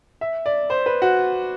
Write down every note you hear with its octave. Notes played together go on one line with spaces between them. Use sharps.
E5
D5
C5
B4
F#4